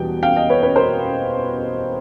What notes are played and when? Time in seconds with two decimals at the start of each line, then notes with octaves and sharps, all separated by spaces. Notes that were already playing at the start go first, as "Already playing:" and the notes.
Already playing: E2 B2 G3 G5
0.23 F5 G5
0.36 D#5 F5
0.50 B4 C#5
0.63 B4 C#5
0.75 A#4 C5